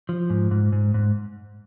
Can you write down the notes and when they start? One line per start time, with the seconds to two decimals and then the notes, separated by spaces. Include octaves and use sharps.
0.09 F3
0.30 G#2
0.51 G#2
0.72 G#2
0.94 G#2